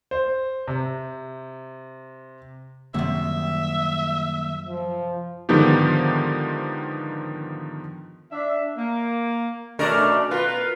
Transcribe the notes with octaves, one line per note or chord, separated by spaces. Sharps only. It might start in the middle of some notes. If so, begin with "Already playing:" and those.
C5
C3
F#2 C3 D#3 G3 A#3 E5
F3
G#2 D3 D#3 F3 B3 G4
D4 E5
A#3
B2 A3 C#4 D4 A#4
B2 F4 A#4 B4